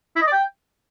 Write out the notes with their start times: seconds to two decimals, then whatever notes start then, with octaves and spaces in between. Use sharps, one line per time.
0.16 E4
0.22 D#5
0.27 D5
0.32 G5